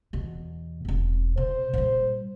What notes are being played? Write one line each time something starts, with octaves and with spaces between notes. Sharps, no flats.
E2 B2
E1 C4
B2 C5
A#2 G3